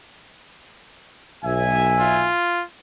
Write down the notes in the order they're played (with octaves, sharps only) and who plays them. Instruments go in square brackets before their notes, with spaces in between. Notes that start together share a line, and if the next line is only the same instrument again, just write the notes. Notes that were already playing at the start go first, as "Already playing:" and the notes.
[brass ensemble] B1 E5 G#5
[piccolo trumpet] F4